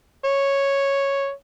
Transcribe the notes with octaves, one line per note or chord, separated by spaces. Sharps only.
C#5